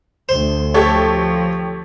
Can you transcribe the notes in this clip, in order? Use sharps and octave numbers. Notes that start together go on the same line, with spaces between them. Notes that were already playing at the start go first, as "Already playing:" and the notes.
D2 C5
F3 G4 A4 C#5